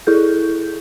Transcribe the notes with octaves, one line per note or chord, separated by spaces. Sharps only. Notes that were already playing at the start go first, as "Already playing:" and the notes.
E4 G#4 A4 G6